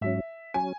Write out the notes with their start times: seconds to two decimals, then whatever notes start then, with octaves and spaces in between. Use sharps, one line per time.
0.01 G#2 F#3 C#4 E5
0.54 F#3 C#4 G#5